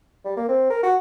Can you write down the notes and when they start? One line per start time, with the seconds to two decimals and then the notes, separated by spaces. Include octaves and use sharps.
0.25 G3
0.37 A#3
0.49 C4
0.70 A#4
0.83 F#4